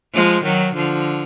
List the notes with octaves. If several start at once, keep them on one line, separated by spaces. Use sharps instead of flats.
F3 G#3
D#3 F#3
D3 F3